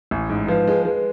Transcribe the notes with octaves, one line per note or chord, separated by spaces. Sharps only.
A1
G#2
F3 B4
G#3
G#3 B4